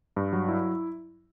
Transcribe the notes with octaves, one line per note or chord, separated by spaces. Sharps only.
G2
F#3
E4